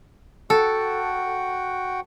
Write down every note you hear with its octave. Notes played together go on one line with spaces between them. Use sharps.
F#4 A4 F#5 G5